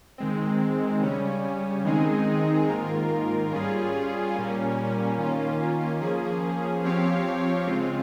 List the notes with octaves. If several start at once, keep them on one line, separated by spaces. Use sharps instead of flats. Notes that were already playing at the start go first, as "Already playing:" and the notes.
D#3 G#3 C4
C#3 G3 C#4
D#3 G#3 C4 D#4 G#4
G#2 D#3 A#3 F4 A#4
G3 C#4 F4 G#4
A#2 G3 A#3 C#4
D#3 A#3 C#4 F4
F3 A#3 C#4 G#4
F3 C4 G4 C#5 F5
C#3 G#3 C4 F4